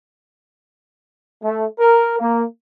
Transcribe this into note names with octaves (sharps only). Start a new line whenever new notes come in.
A3
A#4
A#3